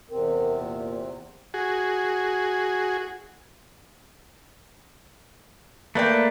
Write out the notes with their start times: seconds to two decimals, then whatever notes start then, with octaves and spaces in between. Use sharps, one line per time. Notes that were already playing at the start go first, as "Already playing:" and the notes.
0.11 E2 C3 C4 A#4
0.60 A#2
1.54 F#4 G#4
5.95 A3 A#3 B4 D5 G5